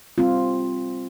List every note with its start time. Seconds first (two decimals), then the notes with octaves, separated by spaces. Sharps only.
0.18 G3 C4 F4